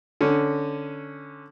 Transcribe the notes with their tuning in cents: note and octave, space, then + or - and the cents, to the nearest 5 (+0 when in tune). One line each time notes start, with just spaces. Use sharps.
D3 +0 C#4 +0